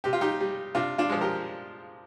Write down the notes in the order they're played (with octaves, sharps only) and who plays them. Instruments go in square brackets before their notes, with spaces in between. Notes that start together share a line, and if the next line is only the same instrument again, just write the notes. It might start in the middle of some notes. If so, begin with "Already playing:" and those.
[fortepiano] C3 G4
F4
D#4 G4
G3
C3 D4 F4
D4 F4
F3 G#3
G4 A#4